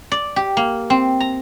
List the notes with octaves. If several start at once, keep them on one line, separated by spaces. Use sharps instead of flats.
D5
G4
A#3
C4
A#5